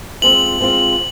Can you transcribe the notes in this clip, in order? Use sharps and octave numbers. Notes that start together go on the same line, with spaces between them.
G#3 C4 F4 F#7
G#3 C4 F4